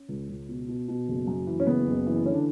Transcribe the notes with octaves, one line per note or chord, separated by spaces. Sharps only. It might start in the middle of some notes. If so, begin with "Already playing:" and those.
Already playing: C#4
C#2
C#2
B2
B2
B2
F#1
F#2
E3
C#4
F#1 B3
F#1
E3
D3 C#4
D4